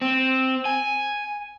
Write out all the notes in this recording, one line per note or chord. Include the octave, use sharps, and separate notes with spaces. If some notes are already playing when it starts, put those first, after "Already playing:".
C4
G#5